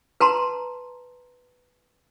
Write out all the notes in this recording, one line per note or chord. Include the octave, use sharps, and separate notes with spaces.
B4 A5 A#5 C6